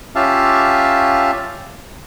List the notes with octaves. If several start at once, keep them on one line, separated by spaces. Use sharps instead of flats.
C#4 F4 G4 E5 F5 A5